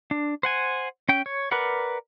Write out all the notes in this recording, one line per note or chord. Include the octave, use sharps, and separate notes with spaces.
D4
C5 F#5 G#5
C#4 G5
C#5
A#4 B4 D5 F#5